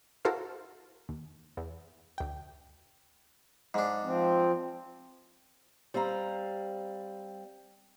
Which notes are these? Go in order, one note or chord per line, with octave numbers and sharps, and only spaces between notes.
E4 F#4 A4 A#4 C5 F5
D#2
E2
D2 G5
G#2 D4
F3 C4
G3 C4 F5 A#5